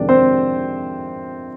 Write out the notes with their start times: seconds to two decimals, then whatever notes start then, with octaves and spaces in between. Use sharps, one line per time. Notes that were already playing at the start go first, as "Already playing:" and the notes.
Already playing: F2 C3 D#3 G#3 D4 D5
0.09 C4 C5